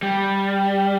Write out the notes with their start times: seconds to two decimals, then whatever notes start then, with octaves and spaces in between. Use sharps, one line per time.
0.02 G3